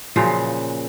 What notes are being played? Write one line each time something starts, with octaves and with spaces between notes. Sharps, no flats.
A#2 C#3 F3 F#3